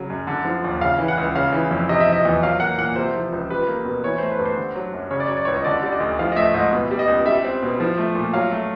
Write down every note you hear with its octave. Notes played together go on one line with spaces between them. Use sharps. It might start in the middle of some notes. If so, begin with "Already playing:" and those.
Already playing: C#3 F#3
F#2
D3
F3
D#2
C#3 F5
E3
F#5
C#2
C#3 F5
E3
F2
C3 D#5
E5
F3
D#5
E2
F#3 F5
A#3 F#5
A#2 F#5
C3 C5
F3
C#2
G3 B4
A#3
B2
E3 C#5
A3 C5
B4
G2
C5
D3
F#3
F#2
C#3 C#5
D5
F#3 C#5
D5
C#2 C#5
D#5
D3 D5
G3 D5
D#5
D2
F3 F5
D#5
A3 E5
G#2 D#5
B2
G3
D#5
C#2
G3 E5
C4
B2
F3
A3
A#2
F#3 F5
A3